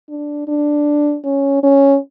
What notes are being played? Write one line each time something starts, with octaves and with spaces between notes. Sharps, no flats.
D4
D4
C#4
C#4